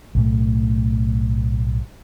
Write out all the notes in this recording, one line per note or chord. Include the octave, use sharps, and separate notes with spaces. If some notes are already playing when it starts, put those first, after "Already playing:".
B1 A2 A3